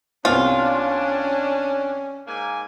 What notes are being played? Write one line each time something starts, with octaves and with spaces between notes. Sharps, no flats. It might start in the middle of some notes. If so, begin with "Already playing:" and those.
C2 B3 C#4 D4 F4
G#2 A#3 G#5